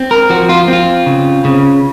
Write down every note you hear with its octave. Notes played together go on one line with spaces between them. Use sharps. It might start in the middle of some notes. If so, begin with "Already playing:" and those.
Already playing: C4
A#4
F3 F#4
F4
C4 F4
C#3
C#3